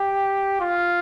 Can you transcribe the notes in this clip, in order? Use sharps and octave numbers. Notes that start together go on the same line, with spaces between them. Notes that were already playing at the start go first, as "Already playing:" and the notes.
Already playing: G4
F4